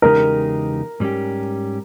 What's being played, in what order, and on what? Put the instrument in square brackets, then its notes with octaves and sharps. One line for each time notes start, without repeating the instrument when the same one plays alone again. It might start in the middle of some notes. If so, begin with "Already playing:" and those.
[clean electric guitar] E2 C#3 G#3 D#4 G4 [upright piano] A#4
[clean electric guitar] G#2 G3 C#4 G4